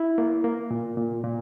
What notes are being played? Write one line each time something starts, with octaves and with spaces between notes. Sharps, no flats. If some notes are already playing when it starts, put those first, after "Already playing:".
Already playing: E4
A#3
A#3
A#2
A#2
A#2